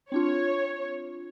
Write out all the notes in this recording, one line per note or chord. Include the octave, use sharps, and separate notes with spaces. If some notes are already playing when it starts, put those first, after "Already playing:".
C4 D4 F4 C#5